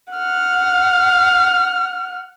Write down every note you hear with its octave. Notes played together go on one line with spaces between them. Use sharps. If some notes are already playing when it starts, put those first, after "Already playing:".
F#5 F6